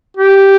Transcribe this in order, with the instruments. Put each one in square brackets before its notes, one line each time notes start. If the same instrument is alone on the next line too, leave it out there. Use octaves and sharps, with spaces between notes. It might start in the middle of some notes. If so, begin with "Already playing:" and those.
[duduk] G4